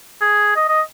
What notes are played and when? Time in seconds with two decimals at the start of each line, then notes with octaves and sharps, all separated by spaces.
0.21 G#4
0.56 D#5
0.69 D#5